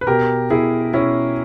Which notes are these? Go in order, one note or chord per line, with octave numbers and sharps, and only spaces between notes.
B4
B2 G4 A#4
B2 E4 G#4
B2 C#4 E4